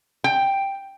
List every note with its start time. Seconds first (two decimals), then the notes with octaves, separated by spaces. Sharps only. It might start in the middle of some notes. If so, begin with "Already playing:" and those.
0.24 G5